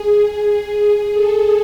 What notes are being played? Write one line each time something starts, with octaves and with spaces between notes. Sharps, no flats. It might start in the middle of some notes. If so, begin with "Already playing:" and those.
Already playing: G#4
G#4
A4